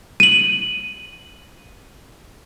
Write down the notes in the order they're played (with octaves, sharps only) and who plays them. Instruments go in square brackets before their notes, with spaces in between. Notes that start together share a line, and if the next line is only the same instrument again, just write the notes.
[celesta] D#7 F#7